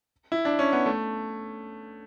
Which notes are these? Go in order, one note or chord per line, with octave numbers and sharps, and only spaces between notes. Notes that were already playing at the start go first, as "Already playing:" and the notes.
E4
D4
C#4
B3
A3